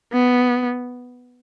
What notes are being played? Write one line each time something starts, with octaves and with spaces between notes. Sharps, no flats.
B3